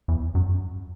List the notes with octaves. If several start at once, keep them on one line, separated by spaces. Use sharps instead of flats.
E2
F#2